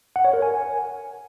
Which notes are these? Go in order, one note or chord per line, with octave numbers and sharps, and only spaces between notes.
F#5
C#5
A#4
G#5